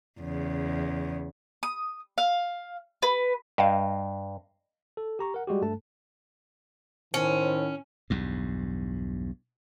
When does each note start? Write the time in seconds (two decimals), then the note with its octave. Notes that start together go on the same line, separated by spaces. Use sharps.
0.20 E2 C#3
1.63 D#6
2.18 F5
3.02 B4
3.58 G2 D#5 F5
4.97 A4
5.19 G4 A#5 C#6
5.34 A#4 F#5
5.47 G3 G#3 F#4 G4
5.62 G2 A3 A4 A5
7.14 A2 D#3 C#4 C5
8.10 B1 E2 G2